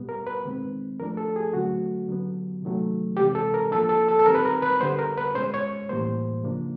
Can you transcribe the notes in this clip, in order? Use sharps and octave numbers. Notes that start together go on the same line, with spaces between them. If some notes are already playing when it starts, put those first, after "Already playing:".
Already playing: B2 G3 B3
A#4
B4
D#3 G#3 C4
F3 A3 D4 A#4
A4
G#4
D3 F#3 A3 C#4 F#4
D3 F#3 B3
C3 D#3 F#3 A3
C3 E3 G#3 G4
A4
A#4
F3 A#3 D4 A4
A4
A4
A4
D#3 G3 C4 A#4
B4
A#4
B4
D3 G3 B3 C5
A#4
B4
B2 G#3 C#4 C5
C#5
A2 E3 G3 A#3 C5
C#3 F3 A#3 D4